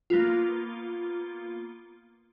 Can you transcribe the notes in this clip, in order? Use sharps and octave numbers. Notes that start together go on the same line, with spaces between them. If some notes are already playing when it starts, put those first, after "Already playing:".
A#3 B3 F4